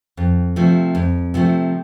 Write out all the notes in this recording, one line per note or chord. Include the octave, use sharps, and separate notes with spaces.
F2
C3 F3 A3
F2
C3 F3 A3